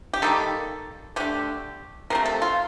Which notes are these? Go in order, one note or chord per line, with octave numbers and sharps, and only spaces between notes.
G4
D#3 G3 A#3 A4
D3 A3 G4
C3 F3 A3 A#4
A4
F4